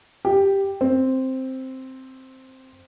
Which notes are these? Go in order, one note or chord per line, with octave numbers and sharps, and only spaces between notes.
G4
C4